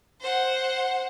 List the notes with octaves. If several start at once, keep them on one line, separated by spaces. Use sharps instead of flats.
C5 F#5